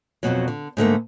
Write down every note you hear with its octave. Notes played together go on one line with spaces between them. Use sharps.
F2 G#2 B2 F#3
D3
G#2 D3 A3 A#3